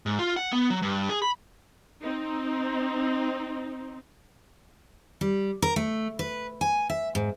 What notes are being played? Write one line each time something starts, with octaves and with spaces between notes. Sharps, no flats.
G#2
F4
F#5
B3
F#3
G2
G#4
B5
C4 D#4
G3
A#4
A3
B4
G#5
E5
G#2